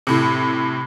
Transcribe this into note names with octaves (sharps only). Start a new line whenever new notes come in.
A2 C3